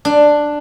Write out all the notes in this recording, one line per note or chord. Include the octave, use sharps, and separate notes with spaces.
D4